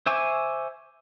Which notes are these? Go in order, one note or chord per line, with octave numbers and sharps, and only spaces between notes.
C5 E5 G#5 C#6 D6